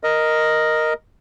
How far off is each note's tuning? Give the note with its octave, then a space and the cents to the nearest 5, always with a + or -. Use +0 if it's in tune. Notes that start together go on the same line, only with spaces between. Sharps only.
A#4 +0 D#5 +0